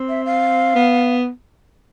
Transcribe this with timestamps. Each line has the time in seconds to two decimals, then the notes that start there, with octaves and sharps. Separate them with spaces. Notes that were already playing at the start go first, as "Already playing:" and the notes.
Already playing: C4
0.09 E5
0.26 F5
0.75 B3